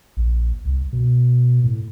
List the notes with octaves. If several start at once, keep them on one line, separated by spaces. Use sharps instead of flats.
A#1
C2
B2
A2